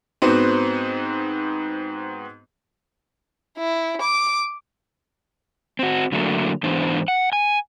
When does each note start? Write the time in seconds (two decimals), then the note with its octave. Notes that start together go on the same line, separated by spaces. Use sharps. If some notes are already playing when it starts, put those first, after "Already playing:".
0.22 G#2 B3 C4 F#4
3.58 E4
4.02 D6
5.79 C4 F#4
6.12 D3 F#3 A3 A#3
6.63 G#2 E3 B3 D4 C5
7.08 F#5
7.33 G#5